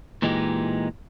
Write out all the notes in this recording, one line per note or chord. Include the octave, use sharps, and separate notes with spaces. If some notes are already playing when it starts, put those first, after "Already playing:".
A#2 E3 G#3 D#4 G4